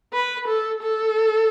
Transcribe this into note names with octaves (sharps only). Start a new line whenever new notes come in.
B4
A4
A4